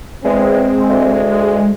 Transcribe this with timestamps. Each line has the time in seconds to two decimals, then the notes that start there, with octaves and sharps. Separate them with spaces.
0.25 E2 G#3 C4
0.90 D2